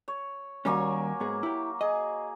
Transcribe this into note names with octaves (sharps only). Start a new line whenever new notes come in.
C#5
D#2 F#3 G3 A#3 C#4 G#5
G#2 B3 G#4
E4 G4
G#4 D#5